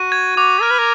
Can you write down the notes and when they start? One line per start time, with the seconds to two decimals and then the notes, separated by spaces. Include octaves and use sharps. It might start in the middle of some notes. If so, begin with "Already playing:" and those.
Already playing: F#4 D#7
0.12 G#6
0.36 F#4 D6
0.62 A#4 F6
0.71 B4
0.78 A#4